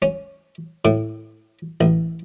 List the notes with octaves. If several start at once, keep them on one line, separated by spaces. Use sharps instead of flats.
C#4
A2
A1